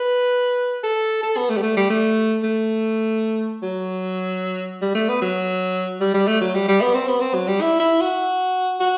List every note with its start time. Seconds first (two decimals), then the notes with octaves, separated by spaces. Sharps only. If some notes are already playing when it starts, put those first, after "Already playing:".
Already playing: B4
0.83 A4
1.23 A4
1.37 B3
1.50 A3
1.57 G3
1.62 A3
1.77 G3
1.90 A3
2.43 A3
3.62 F#3
4.82 G3
4.95 A3
5.09 B3
5.21 F#3
6.01 G3
6.14 G3
6.27 A3
6.41 F#3
6.54 G3
6.68 G3
6.81 B3
6.94 C4
7.08 B3
7.21 C4
7.34 F#3
7.47 G3
7.61 E4
7.80 E4
8.01 F#4
8.80 F#4